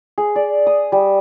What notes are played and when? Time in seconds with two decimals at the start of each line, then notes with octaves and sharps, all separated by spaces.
0.18 G#4
0.36 D5
0.66 D#6
0.92 G3